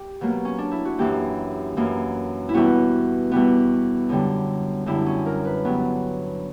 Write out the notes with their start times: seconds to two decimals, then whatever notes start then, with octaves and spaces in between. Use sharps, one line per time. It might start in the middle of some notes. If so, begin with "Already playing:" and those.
Already playing: G4
0.21 B2 F#3 A#3
0.45 C#4
0.58 D4
0.72 E4
0.85 F#4
0.98 F#2 E3 A#3 G4
1.77 F#2 E3 A#3
2.49 E4
2.54 E2 B2 G3 B3 F#4
3.32 E2 B2 G3 B3
4.09 F#2 D3 G3
4.86 F#2 D3 G3 E4
5.06 C#4
5.26 A#4
5.45 B4
5.65 G2 F#3 B3